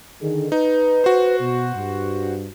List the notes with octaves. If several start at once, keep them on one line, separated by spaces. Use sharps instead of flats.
D3 D#3 G#4
D#4 B4
F#4 C5
B2
G2